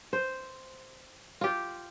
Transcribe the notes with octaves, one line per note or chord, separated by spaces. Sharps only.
C5
F4 G4